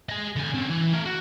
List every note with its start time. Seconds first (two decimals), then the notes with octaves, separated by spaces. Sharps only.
0.09 G#4 D#5
0.36 D3 G#5
0.54 C4 C#4
0.70 E3
0.93 A3 A#4
1.05 F#4